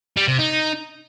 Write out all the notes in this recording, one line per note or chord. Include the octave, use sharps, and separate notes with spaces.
G3
C3
D#4